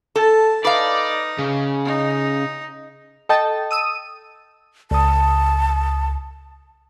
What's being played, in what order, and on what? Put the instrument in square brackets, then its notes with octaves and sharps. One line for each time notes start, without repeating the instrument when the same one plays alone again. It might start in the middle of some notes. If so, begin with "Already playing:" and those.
[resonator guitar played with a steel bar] A4 [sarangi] A5
[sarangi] D#4 [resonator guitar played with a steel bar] B4 F5 [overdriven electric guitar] D5
[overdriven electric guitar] C#3
[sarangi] D#4
[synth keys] A4 D#5 G5 A5
D#6 E6 D#7
[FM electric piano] C#2 D#6 [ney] A5